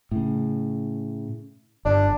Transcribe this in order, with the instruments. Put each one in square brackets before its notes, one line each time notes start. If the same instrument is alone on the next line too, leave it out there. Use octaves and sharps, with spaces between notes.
[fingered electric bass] A2 C#3
[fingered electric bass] G1 [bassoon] D4